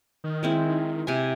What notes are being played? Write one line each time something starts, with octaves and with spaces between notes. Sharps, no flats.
D#3
G#3 C4 E4
C3 E4 G#5